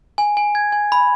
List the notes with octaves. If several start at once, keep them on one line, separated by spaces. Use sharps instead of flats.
G#5
G#5
G#6
G#5
B5